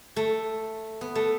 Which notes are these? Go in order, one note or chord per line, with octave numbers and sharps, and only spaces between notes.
A3
B3
A3